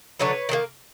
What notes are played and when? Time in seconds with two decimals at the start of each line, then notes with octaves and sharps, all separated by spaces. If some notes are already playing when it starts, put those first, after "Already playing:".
0.19 D3 F#3 A3 B4 C#5
0.49 D#3 F#3 A#3